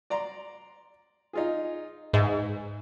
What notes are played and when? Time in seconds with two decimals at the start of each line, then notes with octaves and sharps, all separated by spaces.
0.10 D5 A#5 C6
1.33 D#4 F4 G#4
2.14 G#2 B4 E5 G#5